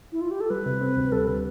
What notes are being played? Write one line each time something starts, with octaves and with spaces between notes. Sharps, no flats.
E4
F4
G4
A4
G3 B4
C3
C4
D2
G3 A4
D3 B4